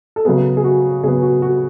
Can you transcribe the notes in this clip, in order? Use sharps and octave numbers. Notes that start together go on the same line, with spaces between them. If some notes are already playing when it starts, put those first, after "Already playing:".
A4
C#3 F#3 B3 G#4
G#4
F#4
C#3 F#3 B3 G#4
F#4
F#4